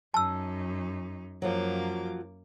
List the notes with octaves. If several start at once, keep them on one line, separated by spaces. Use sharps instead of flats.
F#2 D#4 A5 E6
F#2 F3 F#3 A#3 D6